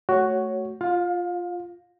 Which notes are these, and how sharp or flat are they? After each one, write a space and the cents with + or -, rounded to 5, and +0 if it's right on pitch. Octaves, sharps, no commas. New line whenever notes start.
A3 +0 F#4 +5 C#5 +0
F4 +0 F5 +30